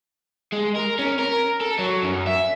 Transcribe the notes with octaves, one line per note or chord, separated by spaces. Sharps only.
G#3
A#4
C#4
A#4
A4
F#3
F#2
E5